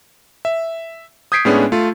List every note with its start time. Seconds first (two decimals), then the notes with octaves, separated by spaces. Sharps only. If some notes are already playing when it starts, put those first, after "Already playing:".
0.45 E5
1.32 D#6 G6 G#6 B6 C7 D7
1.45 A2 G#3 B3 C#4 D4 G#4
1.72 A3 F4